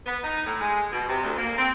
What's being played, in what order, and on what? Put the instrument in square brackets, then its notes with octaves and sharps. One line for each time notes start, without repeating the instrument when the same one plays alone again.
[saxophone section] B3
D#4
A2
G#3
B2
C3
D2
A#3
C4